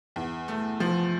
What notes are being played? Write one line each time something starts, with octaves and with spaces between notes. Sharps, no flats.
E2
A3
F3